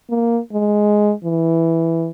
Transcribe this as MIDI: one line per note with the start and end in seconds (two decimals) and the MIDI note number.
0.10 0.40 58
0.53 1.13 56
1.24 2.11 52